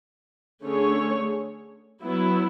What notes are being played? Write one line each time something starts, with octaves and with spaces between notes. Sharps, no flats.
D3 A3 C#4 G#4 C#5
F#3 B3 E4